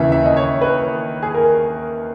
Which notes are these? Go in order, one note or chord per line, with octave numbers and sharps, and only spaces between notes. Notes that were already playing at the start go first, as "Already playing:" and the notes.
Already playing: D#2 C#3 E3 E5
E5
D#5
C#5
B4
G#4
A#4